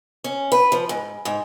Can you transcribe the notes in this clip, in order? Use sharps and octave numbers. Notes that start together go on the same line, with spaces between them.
C#4
B4
F3
G#2
G#2